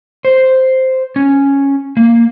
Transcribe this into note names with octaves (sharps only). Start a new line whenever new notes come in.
C5
C#4
A#3